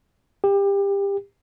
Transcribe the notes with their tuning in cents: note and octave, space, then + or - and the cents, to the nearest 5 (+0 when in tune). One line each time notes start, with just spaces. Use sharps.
G4 +25